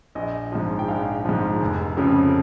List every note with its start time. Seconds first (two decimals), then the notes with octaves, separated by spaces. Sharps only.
0.15 A#1 D#5
0.52 G#2 F3
0.79 G5
0.88 A#1 F5
1.25 G#2 F3
1.61 F1
1.97 F2 C#3 F3